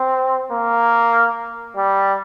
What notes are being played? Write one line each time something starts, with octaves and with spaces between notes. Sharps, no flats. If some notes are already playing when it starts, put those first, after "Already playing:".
Already playing: C4
A#3
G3